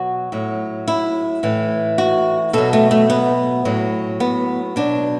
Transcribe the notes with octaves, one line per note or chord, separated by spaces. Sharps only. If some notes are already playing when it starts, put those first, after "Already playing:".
Already playing: B2 F#3 F#4
A2 F#3
E4
A2 E3
F#4
B2 F#3 A4
A3
A3
B3
A2 F#3
B3
B2 F#3 D4